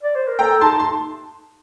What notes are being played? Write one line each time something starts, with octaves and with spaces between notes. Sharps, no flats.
D5
C5
A#4
A4 G5 A#5
D#4 A5 C6
C6